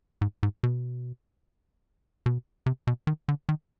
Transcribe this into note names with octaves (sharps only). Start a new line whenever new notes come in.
G#2
G#2
B2
B2
C3
B2
D#3
D3
D#3